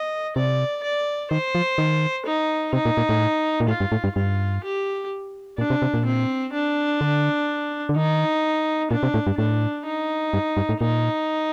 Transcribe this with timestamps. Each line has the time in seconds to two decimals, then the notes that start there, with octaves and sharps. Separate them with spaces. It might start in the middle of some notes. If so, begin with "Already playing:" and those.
Already playing: D#5
0.36 C3 D5
0.83 D5
1.31 D#3 C5
1.55 F3
1.78 D#3
2.26 D#4
2.73 C3 D#4
2.85 A#2
2.97 A#2
3.09 A2
3.60 A#2
3.68 A2 F4
3.80 G2
3.92 A2
4.04 G2
4.16 G2 F4
4.64 G4
5.58 A#2 D4
5.70 C3
5.82 C3
5.94 A#2
6.05 C4
6.54 D4
7.01 D3
7.89 D3
7.96 D#3 D#4
8.91 A#2 D4
9.03 C3
9.14 A2
9.27 G2
9.38 A2 D4
9.86 D#4
10.33 G2
10.57 G2
10.69 A2
10.81 A#2 D#4